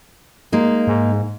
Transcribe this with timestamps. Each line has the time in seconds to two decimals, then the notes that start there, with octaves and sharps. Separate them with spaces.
0.52 G#3 A#3 D#4
0.87 G#2